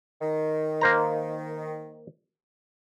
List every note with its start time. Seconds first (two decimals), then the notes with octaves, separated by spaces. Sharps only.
0.21 D#3
0.81 A#3 C5 A#5